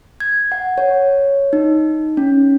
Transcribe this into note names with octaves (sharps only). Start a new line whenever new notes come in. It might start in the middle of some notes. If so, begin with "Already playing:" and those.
G#6
F#5
C#5
D#4
C#4